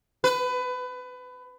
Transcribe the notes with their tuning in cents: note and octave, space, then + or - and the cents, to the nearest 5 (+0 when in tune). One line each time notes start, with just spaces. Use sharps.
B4 +25